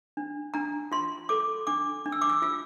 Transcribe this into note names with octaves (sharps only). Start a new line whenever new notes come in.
D4
D4 A#5
F4 C6
A4 D6
D4 D6
D4
E6
D6
E6
F4 E6